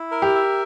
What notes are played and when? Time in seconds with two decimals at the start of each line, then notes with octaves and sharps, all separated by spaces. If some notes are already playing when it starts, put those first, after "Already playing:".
Already playing: E4
0.11 A#4
0.22 G4
0.35 E5